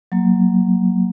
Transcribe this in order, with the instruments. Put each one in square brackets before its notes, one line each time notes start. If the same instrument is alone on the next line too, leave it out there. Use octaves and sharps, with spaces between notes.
[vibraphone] F#3 A#3